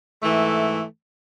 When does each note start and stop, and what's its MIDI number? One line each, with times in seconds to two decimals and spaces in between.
0.23 0.82 44
0.23 0.82 52
0.23 0.82 57